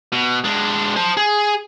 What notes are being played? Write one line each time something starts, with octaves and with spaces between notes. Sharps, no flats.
B2
G#3 D4
C5 A5
G#4